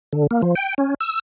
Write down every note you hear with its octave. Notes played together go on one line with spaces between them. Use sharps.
D3
A#3
F3
G5
C#4
E6